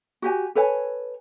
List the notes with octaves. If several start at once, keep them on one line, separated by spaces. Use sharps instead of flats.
F#4 G4 G#5
A4 B4 C#5 G#5